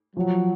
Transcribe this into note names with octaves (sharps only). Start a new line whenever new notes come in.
F3 F#3